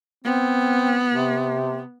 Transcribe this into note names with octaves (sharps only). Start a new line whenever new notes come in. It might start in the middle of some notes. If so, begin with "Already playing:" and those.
B3 C4
C3